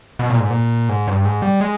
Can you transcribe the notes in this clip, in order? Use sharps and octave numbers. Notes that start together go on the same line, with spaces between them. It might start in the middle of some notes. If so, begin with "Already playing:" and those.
B2
A#2
G#2
A#2
G#2
G2
G#2
G3
G#3